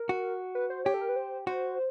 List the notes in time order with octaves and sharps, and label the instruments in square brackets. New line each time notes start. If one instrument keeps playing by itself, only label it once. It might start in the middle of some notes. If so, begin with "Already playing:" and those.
Already playing: [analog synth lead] A#4
[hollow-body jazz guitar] F#4
[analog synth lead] B4
C5
[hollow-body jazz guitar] G4 [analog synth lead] C#5
[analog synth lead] A4
A#4
B4
C5
[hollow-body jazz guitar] F#4 [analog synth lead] C5